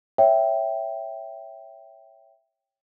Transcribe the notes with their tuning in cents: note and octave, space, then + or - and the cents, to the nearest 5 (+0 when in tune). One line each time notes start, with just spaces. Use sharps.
C#5 +0 E5 +0 G5 +0